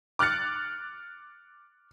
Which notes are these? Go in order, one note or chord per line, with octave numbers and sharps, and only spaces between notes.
D6 F6 F#6 A6 C#7